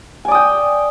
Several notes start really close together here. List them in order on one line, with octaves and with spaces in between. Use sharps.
G#5 D5 D#6 G5